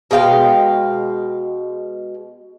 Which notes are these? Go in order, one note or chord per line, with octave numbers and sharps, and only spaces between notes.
B2 G#3 F5 G5